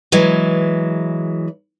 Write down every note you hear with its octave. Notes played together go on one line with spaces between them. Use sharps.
E3 F#3 G#3